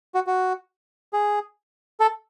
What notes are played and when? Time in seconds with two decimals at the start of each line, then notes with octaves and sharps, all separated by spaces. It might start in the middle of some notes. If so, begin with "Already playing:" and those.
0.15 F#4
0.27 F#4
1.13 G#4
2.00 A4